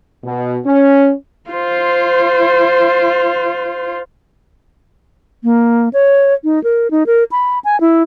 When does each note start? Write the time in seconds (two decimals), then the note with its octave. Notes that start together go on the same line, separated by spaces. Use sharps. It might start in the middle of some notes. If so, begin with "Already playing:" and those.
0.25 B2
0.66 C#4
1.50 F4 C5
5.44 A#3
5.93 C#5
6.44 D#4
6.64 A#4
6.91 D#4
7.07 A#4
7.31 B5
7.64 G#5
7.81 E4